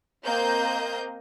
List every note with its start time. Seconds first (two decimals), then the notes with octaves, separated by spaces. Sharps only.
0.24 A#3 C4 D#5 G6